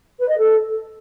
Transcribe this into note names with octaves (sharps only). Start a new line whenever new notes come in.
B4
D#5
A4